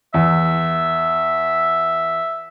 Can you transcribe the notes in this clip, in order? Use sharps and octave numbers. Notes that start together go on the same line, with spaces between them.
E2 E5